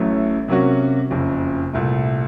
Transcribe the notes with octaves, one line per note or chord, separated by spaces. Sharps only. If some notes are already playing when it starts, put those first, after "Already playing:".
Already playing: A1 A2 F#3 A3 C#4
C3 F#3 A#3 C#4 F#4
F#1 F2 C#3
C2 A#2 A3